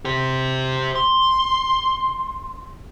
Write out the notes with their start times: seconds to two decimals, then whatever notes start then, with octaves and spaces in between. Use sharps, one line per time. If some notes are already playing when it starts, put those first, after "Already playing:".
0.05 G4 C5
0.95 C6